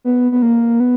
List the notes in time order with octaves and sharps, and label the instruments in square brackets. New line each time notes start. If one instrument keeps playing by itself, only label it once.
[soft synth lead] B3
B3
A#3
B3